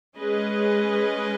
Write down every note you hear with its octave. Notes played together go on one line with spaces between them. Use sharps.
G#3 C#4 G#4 B4 D#5